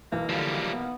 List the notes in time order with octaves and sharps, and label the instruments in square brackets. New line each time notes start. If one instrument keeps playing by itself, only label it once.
[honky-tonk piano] B1 E3 [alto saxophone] A#3
[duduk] D3 [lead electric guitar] F3 G3
[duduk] B3